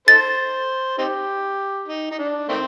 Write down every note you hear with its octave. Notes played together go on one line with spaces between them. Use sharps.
D#4 A4 C5 A6
C4 D#4 G4
D#4
D#4
D4
D#3 A3 C4